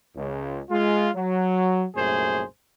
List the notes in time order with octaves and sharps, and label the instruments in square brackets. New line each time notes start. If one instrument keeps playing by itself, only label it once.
[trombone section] C#2
G#3 F4
F#3
C2 F#2 A#2 A3 G#4 C5